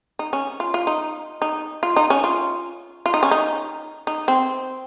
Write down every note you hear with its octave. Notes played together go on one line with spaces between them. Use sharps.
D#4
C#4
F4
F4
D#4
D#4
F4
D#4
C#4
F4
F4
D#4
C#4
D#4
D#4
C4